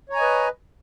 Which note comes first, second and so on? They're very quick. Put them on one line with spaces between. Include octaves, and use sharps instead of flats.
C#5 A#5 G#5 D#5 B4